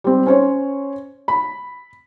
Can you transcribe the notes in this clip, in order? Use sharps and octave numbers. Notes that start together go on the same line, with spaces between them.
G3 C4
C#4 C5 C#5
B5